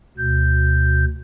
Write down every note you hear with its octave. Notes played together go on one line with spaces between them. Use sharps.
D2 B2 G6